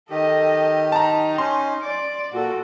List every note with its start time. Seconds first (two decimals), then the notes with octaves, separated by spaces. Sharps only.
0.10 D#3 G4 A4 D#5
0.92 D#4 A5 A#5
1.38 C#4 C6
1.83 D5 D6
2.32 A#2 F#4 A4